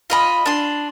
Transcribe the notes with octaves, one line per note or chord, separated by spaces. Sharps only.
F4 D#5 B5
D4 C6